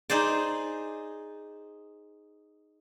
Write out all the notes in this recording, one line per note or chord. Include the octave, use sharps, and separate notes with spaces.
D#4 G#4 C5 D5